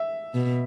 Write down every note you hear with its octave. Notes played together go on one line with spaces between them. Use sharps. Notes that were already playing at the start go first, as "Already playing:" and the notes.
Already playing: E5
B2